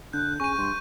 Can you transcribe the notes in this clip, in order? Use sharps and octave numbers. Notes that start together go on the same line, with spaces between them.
D3 F#6 G6
C#3 G#5 C#6 D#7
G2 C6